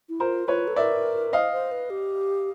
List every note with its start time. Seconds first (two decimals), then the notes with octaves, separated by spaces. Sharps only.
0.09 E4
0.20 F4 A#4 C5
0.48 F4 B4 C#5
0.67 A4
0.76 A#4 D5 E5
1.33 C5 D#5 F5
1.52 C5
1.71 B4
1.90 G4